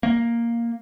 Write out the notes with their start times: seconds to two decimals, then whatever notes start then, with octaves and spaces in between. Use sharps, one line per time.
0.03 A#3